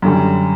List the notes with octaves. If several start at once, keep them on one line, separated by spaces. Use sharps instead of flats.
F#2 D3 G3